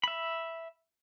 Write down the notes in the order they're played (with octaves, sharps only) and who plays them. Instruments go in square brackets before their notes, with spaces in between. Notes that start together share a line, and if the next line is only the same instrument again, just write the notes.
[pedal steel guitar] E5 B5